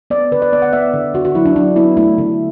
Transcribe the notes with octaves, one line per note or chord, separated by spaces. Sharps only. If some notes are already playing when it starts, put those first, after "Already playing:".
B3 D5
D3 B4
D5
B3 D5
F#5
B3 E5
D3
D3 F#4
F#4
F#3 E4
D4
F#3 D4
B3 E4
A3 E4
D3